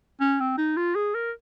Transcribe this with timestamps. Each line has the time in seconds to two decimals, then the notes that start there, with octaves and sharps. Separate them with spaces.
0.21 C#4
0.40 C4
0.58 D#4
0.77 F4
0.95 G#4
1.15 A#4